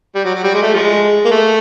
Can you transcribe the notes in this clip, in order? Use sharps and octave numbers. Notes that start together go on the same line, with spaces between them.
G3
F#3
F#3
G3
G#3
A3
F3 G#3
A#3
A3